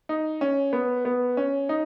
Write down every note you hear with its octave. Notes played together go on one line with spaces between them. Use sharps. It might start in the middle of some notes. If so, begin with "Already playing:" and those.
D#4
C#4
B3
B3
C#4
D#4